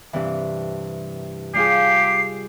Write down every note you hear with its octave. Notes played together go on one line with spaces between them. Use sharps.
G2 C3 E3
G3 F4 G4 G#4 C7